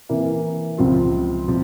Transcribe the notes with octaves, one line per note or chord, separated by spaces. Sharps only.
C3 E3 A#3 E4
C#2 C3 F3 C4 F4
C3 F3